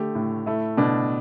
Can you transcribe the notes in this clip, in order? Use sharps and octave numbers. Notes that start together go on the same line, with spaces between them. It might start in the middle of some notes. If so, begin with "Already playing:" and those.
Already playing: D3 A3 G4
A2
A3 E4
B2 D4